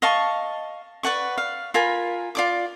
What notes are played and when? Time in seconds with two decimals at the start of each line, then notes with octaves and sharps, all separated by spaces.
0.02 D#5 F5 A5 C#6
1.03 B4 D5 F#5 C#6
1.38 F5
1.74 F4 A#4 G#5 B5
2.35 F4 D5 D6